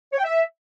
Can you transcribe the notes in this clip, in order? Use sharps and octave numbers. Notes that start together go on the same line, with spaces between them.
C#5
G5
E5